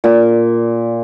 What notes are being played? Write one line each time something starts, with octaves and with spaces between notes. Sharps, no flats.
A#2